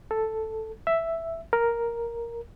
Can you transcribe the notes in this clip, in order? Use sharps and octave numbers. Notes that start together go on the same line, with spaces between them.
A4
E5
A#4